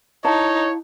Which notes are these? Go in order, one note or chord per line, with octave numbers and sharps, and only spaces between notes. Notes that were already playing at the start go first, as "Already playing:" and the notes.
D#4 E4 C#5 F5 A5 A#5